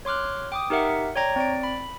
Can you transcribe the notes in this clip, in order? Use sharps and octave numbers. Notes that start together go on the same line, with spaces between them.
C#5 C6 D6 F6 F#6
G5 D6 D#6
D#4 G4 A#4 E5 F#5
C#5 D5 G5 A#5 G#6 A#6
C4 D5 D7
B5